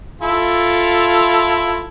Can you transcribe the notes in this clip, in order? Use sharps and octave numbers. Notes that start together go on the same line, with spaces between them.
E4 F4 A4